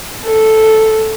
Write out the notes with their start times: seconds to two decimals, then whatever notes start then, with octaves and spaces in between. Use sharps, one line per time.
0.25 A4